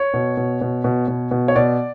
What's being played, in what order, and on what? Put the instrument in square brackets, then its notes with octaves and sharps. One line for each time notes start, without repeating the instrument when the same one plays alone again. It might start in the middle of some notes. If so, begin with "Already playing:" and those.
Already playing: [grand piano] C#5
B2
B2
B2
B2
B2
B2
C#5
B2 D5